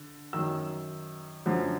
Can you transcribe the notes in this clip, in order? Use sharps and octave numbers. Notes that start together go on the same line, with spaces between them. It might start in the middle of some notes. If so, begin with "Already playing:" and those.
Already playing: D3
F#2 D#3 E6
F#2 D3 F3